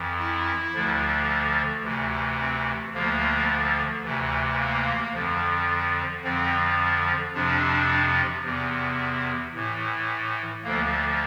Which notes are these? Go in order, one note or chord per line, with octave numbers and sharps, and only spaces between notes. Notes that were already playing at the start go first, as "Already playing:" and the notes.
Already playing: F2 E3
E4
D2 D3 F3
D2 C3 E3
C4
D2 D3 F3 A#3
D2 C3 E3
A#3
F2 D3 F3
F2 D3 F3 C4
F2 C3 F3 D4
E2 C3 E3
A2 E3
D2 D3 F3 A#3